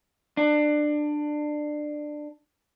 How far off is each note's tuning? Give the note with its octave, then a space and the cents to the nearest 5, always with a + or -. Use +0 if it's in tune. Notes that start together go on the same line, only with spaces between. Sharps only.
D4 +20